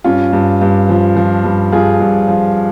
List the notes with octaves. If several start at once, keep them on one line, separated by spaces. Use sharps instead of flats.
G2 C#4 F4
G2
G2
F3
F3
G2
G2 F4 G#4
G2
F3